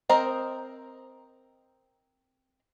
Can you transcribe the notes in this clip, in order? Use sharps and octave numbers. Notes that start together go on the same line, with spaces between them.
C4 A#4 C5 D#5